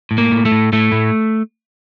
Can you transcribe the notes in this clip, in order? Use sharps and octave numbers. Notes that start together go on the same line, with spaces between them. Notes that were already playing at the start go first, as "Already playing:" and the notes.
A2
A#3
A2
A3
A2
A2 A3
A2